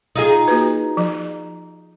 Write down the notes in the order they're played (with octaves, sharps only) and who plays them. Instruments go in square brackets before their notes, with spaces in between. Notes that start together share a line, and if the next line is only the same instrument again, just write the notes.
[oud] D#4 F4 G#4
[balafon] A#3 F#4 B4
F3